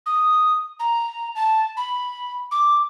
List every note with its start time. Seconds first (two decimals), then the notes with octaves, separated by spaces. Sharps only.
0.06 D#6
0.80 A#5
1.35 A5
1.77 B5
2.52 D6